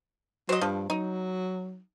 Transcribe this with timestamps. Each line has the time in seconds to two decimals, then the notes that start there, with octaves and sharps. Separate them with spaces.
0.49 F#3 C5 D#5
0.61 G2 F3
0.90 F#3 D#4